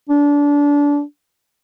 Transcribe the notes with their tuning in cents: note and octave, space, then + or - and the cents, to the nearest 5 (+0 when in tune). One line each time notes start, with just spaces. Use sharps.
D4 -25